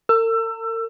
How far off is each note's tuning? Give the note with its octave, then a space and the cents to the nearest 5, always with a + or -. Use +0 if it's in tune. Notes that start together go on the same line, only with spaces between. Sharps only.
A#4 -45 E6 +25